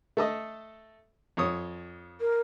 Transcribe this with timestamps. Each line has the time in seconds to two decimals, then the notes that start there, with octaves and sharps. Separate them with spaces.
0.17 A3 A4 D#5
1.37 F2 C#5 D#6
2.20 A#4